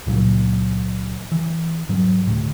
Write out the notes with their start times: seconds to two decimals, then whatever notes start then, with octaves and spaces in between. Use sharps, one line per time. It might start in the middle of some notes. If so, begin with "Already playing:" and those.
0.07 C#2 A#2 F#3 A#3
1.32 E3
1.89 G#2 F#3
2.27 D2 A2